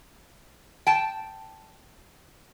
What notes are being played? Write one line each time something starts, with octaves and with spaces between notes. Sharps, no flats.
G5 A5